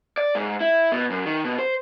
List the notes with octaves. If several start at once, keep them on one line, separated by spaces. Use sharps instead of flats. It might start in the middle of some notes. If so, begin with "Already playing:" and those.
D5
G#2
E4
B2
F#2
D#3
B2
C5